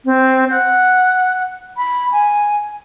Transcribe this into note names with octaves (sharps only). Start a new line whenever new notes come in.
C4
F#5
B5
G#5